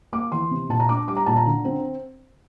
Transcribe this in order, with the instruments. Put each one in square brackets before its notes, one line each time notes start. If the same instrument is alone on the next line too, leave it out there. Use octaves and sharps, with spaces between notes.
[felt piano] A#3 D6
E3 C6
C3
A#2 A5
A#5
D4 D6
G3 D6
A#5
A#2 A5
A#5
D3
C4